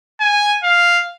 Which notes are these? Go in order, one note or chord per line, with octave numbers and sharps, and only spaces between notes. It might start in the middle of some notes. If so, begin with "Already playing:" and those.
G#5
F5